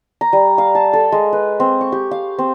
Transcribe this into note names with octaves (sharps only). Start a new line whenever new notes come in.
A#5
G3
F5
A5
A4
G#3
B4
C4
C#6
G4
F5
C4